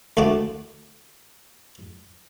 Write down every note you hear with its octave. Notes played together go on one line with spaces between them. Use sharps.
D2 A3 F#4 A5 D6